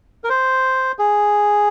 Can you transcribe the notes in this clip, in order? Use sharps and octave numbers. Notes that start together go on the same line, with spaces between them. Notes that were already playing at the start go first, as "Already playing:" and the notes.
A#4
C5
G#4